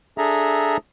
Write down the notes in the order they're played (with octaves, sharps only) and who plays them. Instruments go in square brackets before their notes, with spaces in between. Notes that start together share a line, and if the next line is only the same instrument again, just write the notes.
[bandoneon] D4 G#4 A4 E5 A#5